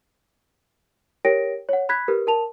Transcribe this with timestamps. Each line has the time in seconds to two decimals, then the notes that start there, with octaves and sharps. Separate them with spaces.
1.25 G4 A#4 C#5 G5 A#6 D7
1.69 C#5 F#5
1.89 B5 F#6 G#6 B6
2.08 G4 A#4 B4
2.27 A#4 A5 F7